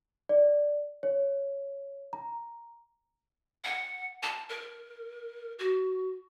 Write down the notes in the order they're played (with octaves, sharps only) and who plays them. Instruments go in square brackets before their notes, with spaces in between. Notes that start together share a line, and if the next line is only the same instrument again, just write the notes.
[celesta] D5
C#5
A#5
[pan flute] F#5
A5
A#4
F#4